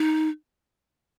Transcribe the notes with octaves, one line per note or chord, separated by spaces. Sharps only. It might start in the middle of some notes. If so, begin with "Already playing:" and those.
Already playing: D#4